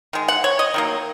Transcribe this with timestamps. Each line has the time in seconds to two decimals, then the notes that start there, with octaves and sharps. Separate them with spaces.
0.13 D#3 G#3
0.28 F#5
0.44 C#5
0.59 D#5
0.74 D#3 F#3 A#3